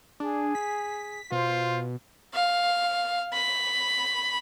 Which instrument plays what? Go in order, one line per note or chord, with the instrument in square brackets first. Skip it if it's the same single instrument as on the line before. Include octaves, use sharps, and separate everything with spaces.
[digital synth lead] D4 [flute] G#4
[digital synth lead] B6
[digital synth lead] B2 [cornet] F4 [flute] C5
[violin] F5
B5